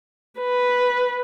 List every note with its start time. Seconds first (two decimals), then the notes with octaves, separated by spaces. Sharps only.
0.40 B4